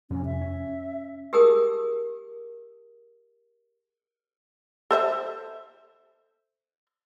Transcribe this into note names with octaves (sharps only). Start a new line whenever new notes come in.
F2 C3 C#4
E5
C#4
G4 G#4 A#4 A5 D#6
A4 C5 E5